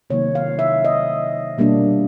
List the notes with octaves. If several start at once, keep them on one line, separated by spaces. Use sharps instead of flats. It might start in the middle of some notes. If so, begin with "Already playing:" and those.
C3 D#3 F#3 A#3 D#4 C#5
F5
E5
D#5
B2 G3 A#3 D4